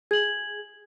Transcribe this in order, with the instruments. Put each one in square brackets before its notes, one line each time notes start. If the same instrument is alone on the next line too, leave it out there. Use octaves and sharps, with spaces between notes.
[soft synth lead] G#4 [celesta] G#6 F#7